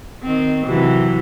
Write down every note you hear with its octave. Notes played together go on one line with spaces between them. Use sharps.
D#3 C4
C3 E3 F#3